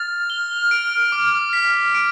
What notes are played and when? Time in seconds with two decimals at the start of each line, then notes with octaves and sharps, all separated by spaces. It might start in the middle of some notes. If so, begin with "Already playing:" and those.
Already playing: F6 A6
0.30 G7
0.71 D7
1.12 D6
1.53 B6
1.95 D7